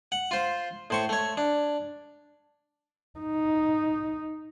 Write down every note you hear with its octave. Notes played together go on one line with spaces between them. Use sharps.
F#5
F4 C5
A2 C5 C#6
A3 C#5
D4
D#4